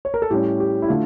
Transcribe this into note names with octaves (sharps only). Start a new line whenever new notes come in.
C#5
A#4
A4
A2 G3 C#4 G4
G4
E4
D3 A3 F4